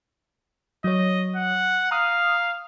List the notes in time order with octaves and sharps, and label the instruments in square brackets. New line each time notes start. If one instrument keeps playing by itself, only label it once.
[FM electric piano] F#3 C#5 [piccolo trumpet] D#5
[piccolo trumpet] F#5
[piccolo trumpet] F5 [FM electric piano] A#5 D#6 F6